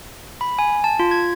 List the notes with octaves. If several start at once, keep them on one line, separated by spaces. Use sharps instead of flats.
B5
G#5
A5
F4
G#6